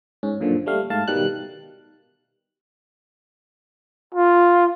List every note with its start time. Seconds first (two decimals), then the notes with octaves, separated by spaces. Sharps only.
0.23 G#2 C#4
0.40 F#2 A#2 D3 F3
0.66 G3 A3 F5
0.90 G#2 A3 F5 A5
1.08 B2 D#3 G3 D#4 F#6
4.14 F4